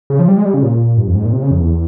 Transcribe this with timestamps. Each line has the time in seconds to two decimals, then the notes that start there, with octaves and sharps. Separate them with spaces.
0.10 C#3
0.19 F3
0.28 G3
0.37 G#3
0.45 G3
0.54 C#3
0.63 A#2
0.98 G2
1.07 F2
1.15 G#2
1.25 A#2
1.33 C3
1.42 C#3
1.51 F2
1.60 E2